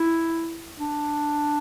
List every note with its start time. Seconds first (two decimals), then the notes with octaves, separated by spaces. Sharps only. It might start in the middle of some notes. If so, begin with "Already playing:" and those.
Already playing: E4
0.78 D4